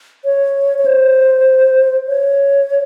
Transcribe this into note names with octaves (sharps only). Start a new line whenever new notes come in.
C#5
C#5
C5
C#5